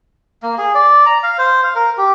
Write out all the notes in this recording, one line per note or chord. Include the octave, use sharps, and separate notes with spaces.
A#3
G#4
D5
A#5
F5
C5
F5
A#4
G4